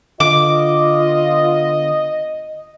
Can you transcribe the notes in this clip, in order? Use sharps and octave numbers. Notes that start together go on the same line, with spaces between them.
D3 B3 F4 D#5 D6